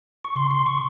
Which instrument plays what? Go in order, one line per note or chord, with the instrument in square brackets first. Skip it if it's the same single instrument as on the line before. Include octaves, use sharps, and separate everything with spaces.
[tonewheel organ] C#6
[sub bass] C#3 [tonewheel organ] C6
[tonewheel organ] C6
[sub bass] C#3 [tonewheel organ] C#6